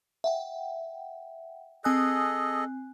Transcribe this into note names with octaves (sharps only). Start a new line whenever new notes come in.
E5 F#5 G5
C4 G#4 A4 D#5 G#5 F#6